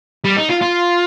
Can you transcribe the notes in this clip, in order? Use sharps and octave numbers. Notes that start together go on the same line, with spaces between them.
G3
D#4
F4
F4